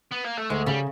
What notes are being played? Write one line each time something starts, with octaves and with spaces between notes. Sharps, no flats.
B3
A#3
A3
D2 G#3
C#3 G3